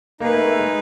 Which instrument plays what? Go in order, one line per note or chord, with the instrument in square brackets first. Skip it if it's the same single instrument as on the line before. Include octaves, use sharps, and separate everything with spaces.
[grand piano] A#3 [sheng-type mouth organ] D#4 G#4 B4
[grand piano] A3
A3
G#3